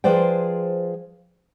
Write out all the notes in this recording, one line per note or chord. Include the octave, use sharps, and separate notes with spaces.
F3 G#4 B4 C5 D5 G5